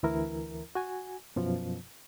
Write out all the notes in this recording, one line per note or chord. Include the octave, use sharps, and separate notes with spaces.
D2 E3 E4 A#4
F#4 G#5
F#2 B2 F3